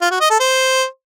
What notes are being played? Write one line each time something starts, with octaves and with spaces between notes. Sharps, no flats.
F4
F#4
D#5
A4
C5